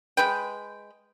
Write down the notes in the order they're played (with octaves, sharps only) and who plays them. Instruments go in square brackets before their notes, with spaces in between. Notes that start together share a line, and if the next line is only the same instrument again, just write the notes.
[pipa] G#3 B4 G5